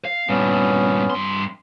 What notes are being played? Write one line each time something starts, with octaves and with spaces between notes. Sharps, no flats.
F5
G2 A#2 B3 C#4
G2 C6